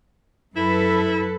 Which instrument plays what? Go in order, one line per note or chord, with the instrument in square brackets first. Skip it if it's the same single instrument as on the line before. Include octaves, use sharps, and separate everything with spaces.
[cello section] F#2 A4 B4 [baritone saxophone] E4